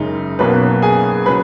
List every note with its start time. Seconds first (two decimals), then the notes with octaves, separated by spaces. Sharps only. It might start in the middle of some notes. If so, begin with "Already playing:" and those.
Already playing: F#1 F#2 C#3 G#3 D#4
0.39 B1 B2 F#3 A#3 C#4 B4
0.82 G#4 G#5
1.26 C#3 F#3 B4 B5